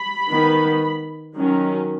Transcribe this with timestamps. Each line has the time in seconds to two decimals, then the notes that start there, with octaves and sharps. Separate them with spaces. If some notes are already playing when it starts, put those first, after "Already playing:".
Already playing: B5
0.29 D#3 B3
1.37 D#3 F#3 C#4